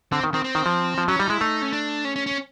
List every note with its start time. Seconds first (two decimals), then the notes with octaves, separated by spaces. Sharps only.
0.12 D3 C4
0.24 D#3
0.34 D#3 C4
0.44 C4
0.55 D#3
0.66 F3
0.98 F3
1.08 F#3 C#4
1.19 G3 D#4
1.30 G#3 E4
1.41 A3 D#4
1.62 C#4
1.73 D4
2.05 C#4
2.16 C#4
2.26 C#4